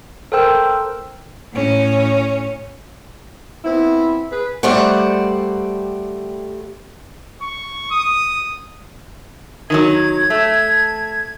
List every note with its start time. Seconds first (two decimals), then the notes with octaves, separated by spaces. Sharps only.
0.32 A4 A#4 C5 G5 E6
1.51 A2 C#4
3.65 B3 C4 E4
4.32 G#4 B4
4.63 G3 A3 C5 D5 F#5
7.42 C#6
7.91 D#6
9.70 D#3 F3 F#3 G#6
10.30 A3